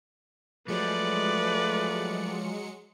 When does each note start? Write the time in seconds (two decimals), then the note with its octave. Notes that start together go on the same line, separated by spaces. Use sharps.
0.68 F3 F#3 G#3 A3 B4 D5 C#7